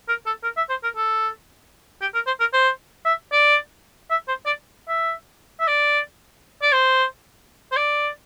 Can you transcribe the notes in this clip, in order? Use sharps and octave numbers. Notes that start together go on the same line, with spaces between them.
A#4
A4
A#4
E5
C5
A#4
A4
G4
A#4
C5
A#4
C5
E5
D5
E5
C5
D5
E5
E5
D5
D5
C5
C5
D5